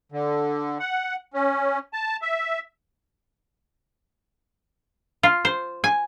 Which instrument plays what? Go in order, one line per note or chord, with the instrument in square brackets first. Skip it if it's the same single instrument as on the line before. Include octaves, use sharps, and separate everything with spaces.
[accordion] D3
F#5
C#4
A5
E5
[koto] F4
C5
G#5